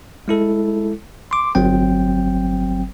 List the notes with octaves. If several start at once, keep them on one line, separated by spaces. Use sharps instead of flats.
G#3 E4 A4
C6 D6
G1 F#3 C4 G5